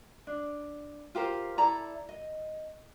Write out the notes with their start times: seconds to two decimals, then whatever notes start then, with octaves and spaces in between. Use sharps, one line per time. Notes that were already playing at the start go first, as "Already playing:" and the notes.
0.27 D4
1.15 F4 G4 A#4 C5
1.57 E4 A4 D5 A#5
2.09 D#5